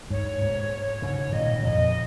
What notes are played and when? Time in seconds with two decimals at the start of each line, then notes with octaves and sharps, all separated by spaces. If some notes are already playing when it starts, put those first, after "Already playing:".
0.10 G#2 C#5
0.42 G#2
1.02 G#2 C#3
1.33 A#2 D#3 D#5
1.59 C#3
1.63 F2 A#2 D#5